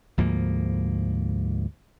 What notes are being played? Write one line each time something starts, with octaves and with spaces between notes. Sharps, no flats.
D2 G#2 F3 A#3